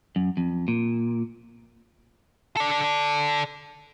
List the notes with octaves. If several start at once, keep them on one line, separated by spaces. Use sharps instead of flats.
F#2
F2
A#2
A4 D5